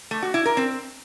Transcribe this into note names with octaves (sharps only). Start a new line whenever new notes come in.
A3
F#4
E4
A#4
C4